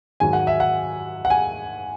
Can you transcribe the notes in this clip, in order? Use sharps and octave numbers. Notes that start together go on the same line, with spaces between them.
G#2 D#3 F#3 G#5
F#5
E5
F#5
F#5
G#5